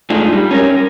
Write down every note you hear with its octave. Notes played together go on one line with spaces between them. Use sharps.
G#2 A3 D4 D#4 F4 G#4
G3
C#4 A4 A#4